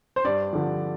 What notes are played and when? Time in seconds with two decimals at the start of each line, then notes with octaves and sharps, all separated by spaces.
0.16 C5
0.24 G2 D5
0.53 D3 F3